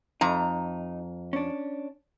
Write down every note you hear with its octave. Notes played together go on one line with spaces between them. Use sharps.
F2 D#4 A#5
C#4 D4